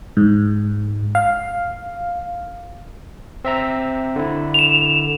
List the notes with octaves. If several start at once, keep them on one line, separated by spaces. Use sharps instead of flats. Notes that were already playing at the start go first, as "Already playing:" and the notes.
G#2
F5
C4 E5 A#5
D3 E4
E7 F7